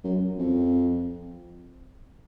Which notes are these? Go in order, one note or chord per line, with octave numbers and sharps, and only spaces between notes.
F#2
F2